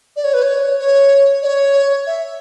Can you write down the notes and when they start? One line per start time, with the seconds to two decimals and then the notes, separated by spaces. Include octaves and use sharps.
0.16 D5
0.24 C#5
0.34 B4
0.43 C#5
0.79 C#5
1.42 D5
1.46 C#5
2.07 E5